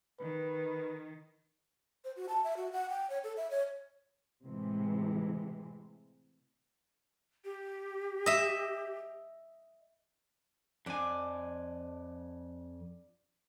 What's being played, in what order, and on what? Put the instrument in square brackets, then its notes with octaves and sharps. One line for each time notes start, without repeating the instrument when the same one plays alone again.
[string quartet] D#3 [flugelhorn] B4
[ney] C5
F#4
A5
E5
F#4
F#5
G5
C#5
A4
E5
C#5
[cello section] A2 C3 E3 G#3
[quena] G4
[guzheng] D#5 E5
[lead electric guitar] F2 G#5 [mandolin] D4 F4 D5